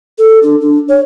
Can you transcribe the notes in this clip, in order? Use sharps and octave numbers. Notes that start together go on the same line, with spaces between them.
A4
D4
D4
C#5